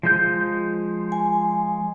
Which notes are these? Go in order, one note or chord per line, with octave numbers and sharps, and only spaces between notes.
F3 G#3 G6
G#5